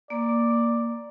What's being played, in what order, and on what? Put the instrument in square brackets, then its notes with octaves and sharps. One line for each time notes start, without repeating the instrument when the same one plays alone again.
[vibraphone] A#3 [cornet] D5